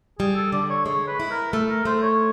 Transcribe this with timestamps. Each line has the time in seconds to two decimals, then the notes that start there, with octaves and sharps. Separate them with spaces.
0.19 G3 G#4
0.35 A4
0.52 D3 D5
0.70 C#5
0.86 G#3 C#5
1.08 B4
1.20 E4
1.31 A#4
1.53 A3 A4
1.69 A#4
1.85 A3 C5
2.03 C#5